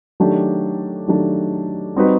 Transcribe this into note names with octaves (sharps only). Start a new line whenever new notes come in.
D#3 F#3 A3 D4 G4
D#3 F#3 A3 D4 G4
G3 C4 D#4 F#4 B4